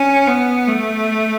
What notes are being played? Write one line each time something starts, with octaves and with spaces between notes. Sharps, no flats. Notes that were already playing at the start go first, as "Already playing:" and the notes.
Already playing: C#4
B3
A3